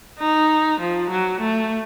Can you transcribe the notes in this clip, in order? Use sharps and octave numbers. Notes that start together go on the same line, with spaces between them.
D#4
F3
F#3
A3